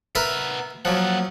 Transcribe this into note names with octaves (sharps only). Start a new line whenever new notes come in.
B3 A#4 B4 E5 A#5
F3 F#3 A#3 F#5